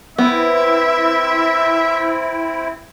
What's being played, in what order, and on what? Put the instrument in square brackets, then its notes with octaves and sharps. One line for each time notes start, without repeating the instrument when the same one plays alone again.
[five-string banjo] B3 [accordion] C4 E4 [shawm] E5